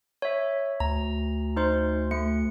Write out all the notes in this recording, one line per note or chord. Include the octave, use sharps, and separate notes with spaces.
C#5 E5
D2 A#5
D#4 C5 C6
A3 C#7